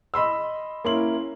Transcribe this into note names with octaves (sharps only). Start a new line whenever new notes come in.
D#5 B5 C6 E6
A#3 C#4 E4 C6 F#7